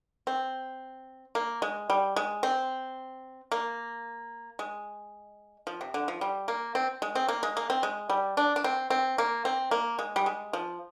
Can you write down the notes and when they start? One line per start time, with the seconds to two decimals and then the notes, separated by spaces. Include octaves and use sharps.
0.27 C4
1.35 A#3
1.62 G#3
1.90 G3
2.16 G#3
2.43 C4
3.52 A#3
4.59 G#3
5.67 F3
5.81 C3
5.94 D3
6.08 F3
6.21 G3
6.48 A#3
6.75 C4
7.02 G#3
7.15 C4
7.28 A#3
7.43 G#3
7.57 A#3
7.70 C4
7.83 G#3
8.10 G3
8.37 D4
8.56 D4
8.64 C4
8.90 C4
9.18 A#3
9.45 C4
9.71 A#3
9.99 G#3
10.16 G3
10.26 G#3
10.53 F3